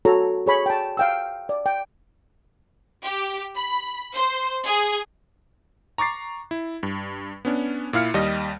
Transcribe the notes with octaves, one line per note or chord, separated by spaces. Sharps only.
F#4 A4 C#5 A#5
G#4 C#5 B5 C#6
G5 A5
F5 G5 E6
D5
G5
G4
B5
C5
G#4
A#5 C#6 D6 A6 C7
E4
G2
B3 C#4 D4
A#2 E4 F5 F6 C#7
D#2 G3 D#5